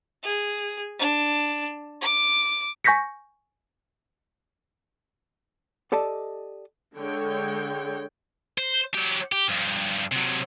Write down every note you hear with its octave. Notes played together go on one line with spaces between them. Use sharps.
G#4
D4
D6
G#5 C#6 G6 A#6 B6 C#7
G4 A4 D5 D#5 A5
D3 G#3 C#5 G5
C5
F#3 G4
G4
G2 F3
C3 F#3